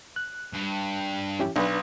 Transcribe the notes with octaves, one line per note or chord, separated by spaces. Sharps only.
F#6
G2
C#4 E4 G4
B1 D4 B4